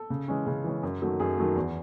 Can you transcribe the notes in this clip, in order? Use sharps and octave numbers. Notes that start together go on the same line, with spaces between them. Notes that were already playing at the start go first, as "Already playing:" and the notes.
Already playing: A4
C#3
E3 G#3 C#4
C#3 G#4
E3 G#3 C#4
F#2
D#3 F#3 A3
F#2 G#4
D#3 F#3 A3
E2